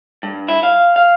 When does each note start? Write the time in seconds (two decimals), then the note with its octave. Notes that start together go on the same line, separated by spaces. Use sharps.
0.23 G2
0.49 E4
0.63 F5
0.96 F5